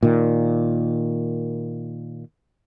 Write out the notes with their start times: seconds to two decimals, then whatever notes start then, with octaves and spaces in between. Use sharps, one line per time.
0.03 A#2 D#3